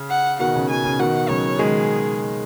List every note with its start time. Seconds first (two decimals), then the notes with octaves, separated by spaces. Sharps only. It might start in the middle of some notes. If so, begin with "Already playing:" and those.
Already playing: C#3
0.10 F#5
0.39 B2 D#3 F#5
0.55 C#3
0.69 B2 G#5
0.84 C#3
0.99 B2 D#3 F#5
1.29 C#3 F#3 C#5
1.59 D#3 G#3 G#4